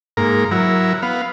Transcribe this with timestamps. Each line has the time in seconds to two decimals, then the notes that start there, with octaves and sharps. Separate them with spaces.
0.17 G#2 A#3 A#4
0.51 F#3 E4 A#4
1.02 B3 F5